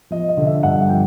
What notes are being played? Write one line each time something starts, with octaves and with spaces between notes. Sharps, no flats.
F3 D#5
D#5
D3
E5
G2 F#5
F3 G5